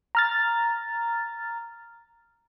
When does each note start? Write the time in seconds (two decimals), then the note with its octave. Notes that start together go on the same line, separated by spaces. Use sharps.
0.15 A#5 F6 A6